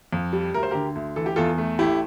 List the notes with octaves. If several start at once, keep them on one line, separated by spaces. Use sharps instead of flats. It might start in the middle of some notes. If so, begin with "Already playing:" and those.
F2
G3
D2 A#4
C5
D3 G4 A#4
D2
E3 A4
G4
E2 F4 A4
A3
A1 E4 G4